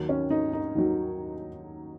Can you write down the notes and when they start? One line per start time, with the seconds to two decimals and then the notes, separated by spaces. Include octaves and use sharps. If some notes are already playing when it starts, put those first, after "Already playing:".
Already playing: D#2 D#3 F#3
0.09 C#4
0.30 D#4
0.53 D#4
0.75 D#2 D#3 F#3